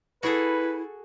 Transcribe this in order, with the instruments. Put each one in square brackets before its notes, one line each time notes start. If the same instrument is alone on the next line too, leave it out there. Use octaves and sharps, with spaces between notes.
[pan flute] E4 [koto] F#4 G#4 A4 [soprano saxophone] B4